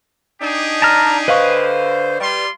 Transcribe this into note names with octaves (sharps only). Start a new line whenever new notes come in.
D4 D#4 G4 G#4
A5 A#5 F6
D3 B4 C5 D#5 F5 C#6
G3 F4 C6